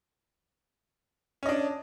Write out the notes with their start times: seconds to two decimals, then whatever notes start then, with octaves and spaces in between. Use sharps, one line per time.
1.43 C#4
1.46 D#5
1.49 D4